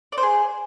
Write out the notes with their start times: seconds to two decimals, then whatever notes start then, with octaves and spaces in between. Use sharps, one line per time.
0.12 D5
0.18 C5
0.23 G#4